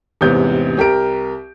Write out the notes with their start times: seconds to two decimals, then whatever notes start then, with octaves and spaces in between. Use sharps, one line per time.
0.21 A1 E2 G#2 C3 B3 G6
0.77 C2 G4 A#4 D7